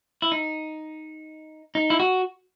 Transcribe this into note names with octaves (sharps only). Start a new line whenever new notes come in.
E4
D#4
D#4
E4
F#4